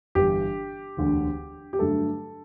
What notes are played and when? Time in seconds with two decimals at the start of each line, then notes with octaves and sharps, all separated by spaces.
0.15 G1 G2 E3 G4
0.97 E1 D2 D3
1.73 G4
1.79 G2 D3 F#3 A3 A4